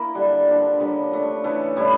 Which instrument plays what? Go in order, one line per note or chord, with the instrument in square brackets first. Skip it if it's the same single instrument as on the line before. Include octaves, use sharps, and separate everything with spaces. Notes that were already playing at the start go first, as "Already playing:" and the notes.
Already playing: [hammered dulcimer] A#3 E4 A#4
D3 G3 D4 G4
F3 A#3 D4
C#3 G3 A#3
F3 A3 D4
C#3 E3 A3
A2 G3 C#4 E4